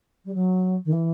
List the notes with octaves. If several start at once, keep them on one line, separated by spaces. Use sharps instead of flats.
G3
F#3
D#3
E3